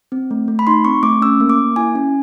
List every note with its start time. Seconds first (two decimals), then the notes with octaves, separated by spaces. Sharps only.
0.12 C4
0.31 A3
0.48 A3
0.59 B5
0.67 D#4 C6
0.85 C4 C#6
1.03 A3 D6
1.22 C#4 E6
1.40 A#3
1.50 D6
1.59 A#3
1.76 E4 G#5
1.95 C#4